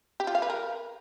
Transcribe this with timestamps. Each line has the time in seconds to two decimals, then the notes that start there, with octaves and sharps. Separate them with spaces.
0.20 G4
0.27 F4
0.35 F5
0.42 B4
0.50 A#4